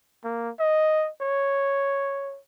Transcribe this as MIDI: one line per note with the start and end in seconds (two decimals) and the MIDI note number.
0.24 0.50 58
0.59 1.10 75
1.21 2.39 73